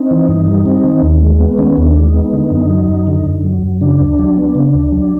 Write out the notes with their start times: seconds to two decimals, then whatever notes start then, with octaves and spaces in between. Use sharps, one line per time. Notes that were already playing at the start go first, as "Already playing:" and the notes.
Already playing: C4 D#4
0.11 E3
0.28 G2
0.47 G3
0.66 C4
0.84 D#3
1.03 D#2
1.22 G#3
1.40 B3
1.58 D#3 C#4
1.77 D#2
1.83 D4
1.96 G#3
2.07 D#4
2.14 B3
2.33 D3
2.51 F#2
2.69 F#3
2.88 F#2
3.07 D3
3.26 F#2
3.44 F#3
3.63 F#2
3.81 C#3 D4
4.00 D2
4.19 F#3
4.37 B3
4.55 C#3
4.74 D2
4.92 F#3